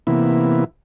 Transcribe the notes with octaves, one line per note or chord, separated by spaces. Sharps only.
C3 E3 A#3 B3 E4